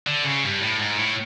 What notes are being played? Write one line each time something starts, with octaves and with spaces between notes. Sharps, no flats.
D3
C#3
G2
A2
G#2
A2